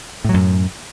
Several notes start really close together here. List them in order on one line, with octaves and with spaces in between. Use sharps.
A2 F#3 F#2